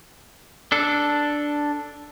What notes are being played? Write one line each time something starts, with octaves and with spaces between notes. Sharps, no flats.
D4 A4